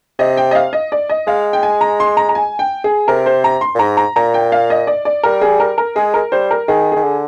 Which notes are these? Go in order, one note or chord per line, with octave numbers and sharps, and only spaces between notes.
C3 D#5
G5
D#5
F5
D#5
D5
D#5
G#3 F5
G5
G#5
A#5
C6
A#5
A#5
G#5
G5
G#4
C3 A#4
C5
A#5
C6
A#2
G#2 A#5
A#5
A#2 A#5
G5
F5
D#5
D5
D5
G3 A#4
G#4
A#4
A#4
G#3 G#4
A#4
G3 C5
A#4
D#3 G#4
D#3 G#4
D3